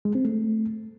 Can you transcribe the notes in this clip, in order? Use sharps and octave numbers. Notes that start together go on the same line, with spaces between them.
G#3
C4
A3